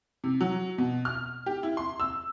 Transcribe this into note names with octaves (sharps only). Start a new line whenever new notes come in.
C3
F#3
B2
F6
G4
E4
C6
E6